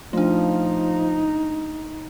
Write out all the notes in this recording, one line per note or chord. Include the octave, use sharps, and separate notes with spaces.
F3 A3 D4 D#4